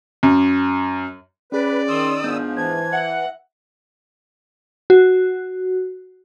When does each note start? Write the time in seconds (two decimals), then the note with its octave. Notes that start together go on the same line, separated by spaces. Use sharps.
0.23 F#2
1.52 C#4 G#4 B4 D5
1.89 D#3 C6 D#6 E6
2.24 G#2 F3 B3 D4 G6
2.57 E3 C5 A5 G#6
2.93 E5 F#5
4.90 F#4